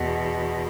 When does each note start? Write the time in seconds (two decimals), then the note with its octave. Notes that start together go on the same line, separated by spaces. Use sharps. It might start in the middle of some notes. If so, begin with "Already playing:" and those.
Already playing: E2 B2